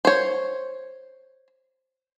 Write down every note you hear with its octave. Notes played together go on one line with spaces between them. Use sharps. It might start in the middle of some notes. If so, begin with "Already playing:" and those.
C5 C#5